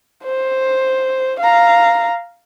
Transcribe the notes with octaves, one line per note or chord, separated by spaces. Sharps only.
C5
F5 A#5